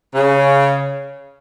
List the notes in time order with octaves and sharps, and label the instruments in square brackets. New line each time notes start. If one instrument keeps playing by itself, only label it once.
[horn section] C#3